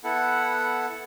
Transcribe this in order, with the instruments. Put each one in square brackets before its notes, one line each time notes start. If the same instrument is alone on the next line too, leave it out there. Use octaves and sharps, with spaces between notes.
[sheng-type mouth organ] B3 E4 A4 F#5